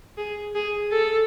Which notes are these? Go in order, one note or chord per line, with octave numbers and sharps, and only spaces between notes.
G#4
G#4
A4